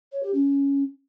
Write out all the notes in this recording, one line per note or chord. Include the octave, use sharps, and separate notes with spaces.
C#5
G4
C#4